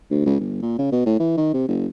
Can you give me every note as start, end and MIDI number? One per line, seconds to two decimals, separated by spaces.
0.11 0.23 38
0.26 0.35 37
0.40 0.62 31
0.62 0.79 46
0.79 0.89 49
0.92 1.05 47
1.06 1.16 45
1.20 1.34 52
1.37 1.51 51
1.54 1.66 48
1.68 1.87 30